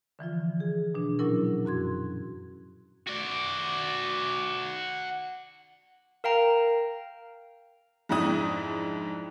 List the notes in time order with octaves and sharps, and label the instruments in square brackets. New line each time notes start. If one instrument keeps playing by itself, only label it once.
[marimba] D3 E3 F3 F4
G#4
B2 D4
A#2 F#3 C#4 E4 A#4
F#2 F#4 C6 G#6
[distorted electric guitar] F#4 D5
[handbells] A#4 F5 G5 A#5
[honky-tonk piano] F2 G#2 D4 E4 D#6